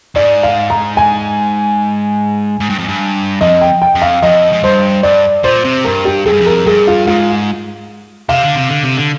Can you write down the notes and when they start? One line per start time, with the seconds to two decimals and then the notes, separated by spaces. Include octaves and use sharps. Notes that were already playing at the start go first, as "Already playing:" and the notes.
0.16 G#2 D5
0.43 F5
0.70 A#5
0.97 G#5
2.60 G#2
2.70 G2
2.78 F2
2.88 G2
3.41 F2 D#5
3.61 G5
3.82 G5
3.95 F2
4.02 F5
4.22 F2 D#5
4.52 G#2
4.63 G2 C5
5.03 G2 D5
5.44 A#2 C5
5.65 C3
5.84 G2 A#4
6.05 G4
6.26 F2 G#4
6.33 G2
6.41 F2
6.46 A#4
6.66 G2 G#4
6.87 F4
7.07 G#2 F4
8.29 C3 F5
8.43 D3
8.56 C3
8.69 D3
8.84 C3
8.97 D3